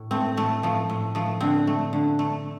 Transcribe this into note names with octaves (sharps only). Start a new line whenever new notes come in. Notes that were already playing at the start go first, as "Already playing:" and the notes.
Already playing: A2
A3 C4
A2 A3
F3 A3
A2
F3 A3
D3 C4
A3
D3
A3